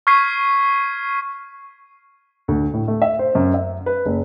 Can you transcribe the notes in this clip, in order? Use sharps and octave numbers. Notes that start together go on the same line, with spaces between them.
C#6 F6 G#6 B6 C7 D#7
D2
A2
A3
E5
C5
F#2
E5
B4
F#1